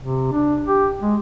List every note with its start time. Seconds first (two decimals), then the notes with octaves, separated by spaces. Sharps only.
0.01 C3
0.32 D4
0.66 G4
1.02 G#3